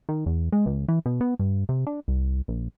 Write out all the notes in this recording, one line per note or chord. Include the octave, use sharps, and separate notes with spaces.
D#3
E2
G#3
C#2
E3
B2
B3
G2
C3
D4
C2
A#1